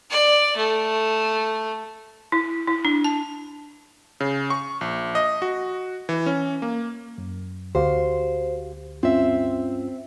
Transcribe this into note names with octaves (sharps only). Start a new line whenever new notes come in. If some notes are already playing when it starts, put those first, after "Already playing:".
D5
A3
E4
E4
D4
A5
C#3
C#6
A#1
D#5
F#4
E3
C#4
A#3
F#2
D2 F#4 G4 C5 F5
G2 C4 C#4 F4 E5